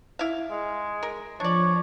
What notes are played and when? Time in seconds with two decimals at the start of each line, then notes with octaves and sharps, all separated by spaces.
0.19 E4 F5
0.50 G#3
1.03 A#4
1.40 F3 D4 C#5 D5